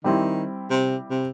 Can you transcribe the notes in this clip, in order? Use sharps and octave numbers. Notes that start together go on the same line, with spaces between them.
D#3 G3 C4 E4
C3
C3